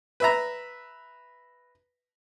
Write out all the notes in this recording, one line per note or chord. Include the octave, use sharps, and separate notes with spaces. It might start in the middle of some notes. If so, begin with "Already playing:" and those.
B4 E5 A#5